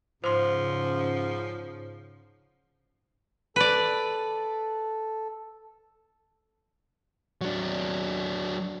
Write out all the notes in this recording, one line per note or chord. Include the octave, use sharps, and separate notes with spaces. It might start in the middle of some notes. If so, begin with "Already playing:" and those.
G#2 C#3 F3 C5 C6
A4 B4 D5
F#3 D4